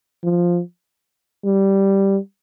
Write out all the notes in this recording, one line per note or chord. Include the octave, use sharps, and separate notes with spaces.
F3
G3